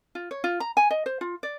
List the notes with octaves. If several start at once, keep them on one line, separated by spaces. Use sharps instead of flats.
F4
C#5
F4
A#5
G#5
D#5
C5
F4
D5